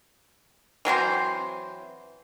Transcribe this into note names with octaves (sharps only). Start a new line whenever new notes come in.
E3 F#3 C4 C5